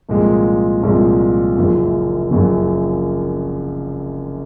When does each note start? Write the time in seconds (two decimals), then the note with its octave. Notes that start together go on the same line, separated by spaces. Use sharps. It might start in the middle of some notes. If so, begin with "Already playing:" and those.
0.09 C2 A#2 F3 G#3
0.83 C2 A#2 F3 G#3
1.57 F#1 F#2 F3
2.31 F#1 F#2 F3